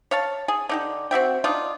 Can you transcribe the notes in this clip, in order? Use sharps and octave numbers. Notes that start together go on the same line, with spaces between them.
C#5 F5 A5
G#4
D3 D#4 G4
C4 F#4 E5 G5
D4 D#4 F4